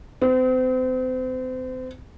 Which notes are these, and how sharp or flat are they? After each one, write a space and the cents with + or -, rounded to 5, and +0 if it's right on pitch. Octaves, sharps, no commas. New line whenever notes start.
C4 -35